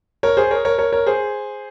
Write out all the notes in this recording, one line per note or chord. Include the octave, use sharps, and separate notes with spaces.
A#4 C#5
G#4 C5
A#4 C#5
A#4 C#5
A#4 C#5
A#4 C#5
G#4 C5